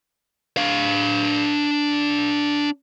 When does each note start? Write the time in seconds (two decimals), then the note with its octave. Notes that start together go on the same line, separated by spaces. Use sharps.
0.57 D4 F5